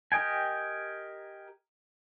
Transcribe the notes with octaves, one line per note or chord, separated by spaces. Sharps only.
G4 A#4 D#5 G5 G#5